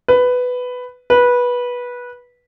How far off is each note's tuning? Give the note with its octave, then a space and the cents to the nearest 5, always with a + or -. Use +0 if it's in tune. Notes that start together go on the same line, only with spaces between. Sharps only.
B4 +10
B4 -15